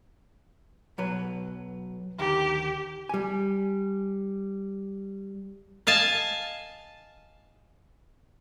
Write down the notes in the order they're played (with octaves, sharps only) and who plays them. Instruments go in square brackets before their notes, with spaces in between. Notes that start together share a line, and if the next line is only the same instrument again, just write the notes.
[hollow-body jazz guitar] B1 F#3 B4
[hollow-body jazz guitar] D2 D#3 A#5 [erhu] G4
[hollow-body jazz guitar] G3 G#5
[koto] D#5 F5 G#5 A5